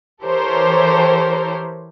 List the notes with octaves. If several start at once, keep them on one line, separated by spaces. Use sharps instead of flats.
E3 G4 A4 A#4 C5 C#5